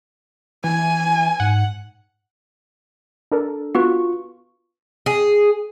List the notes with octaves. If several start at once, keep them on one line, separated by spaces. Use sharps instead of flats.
E3 G#5
G#2 F#5
D4 A4 A#4
B3 F4 F#4 B4 C#6
G#4